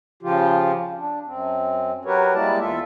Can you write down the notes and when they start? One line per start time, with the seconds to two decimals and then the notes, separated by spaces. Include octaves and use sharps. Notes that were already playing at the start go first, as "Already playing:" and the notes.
0.23 C#3 F3 F4 G4
0.98 D4
1.26 F#2 C4
2.05 F#3 F#4 G4 A#4 B4 C#5
2.34 G3 G#3 A#3 E4 D5 A5
2.60 E2 F4 A4 E5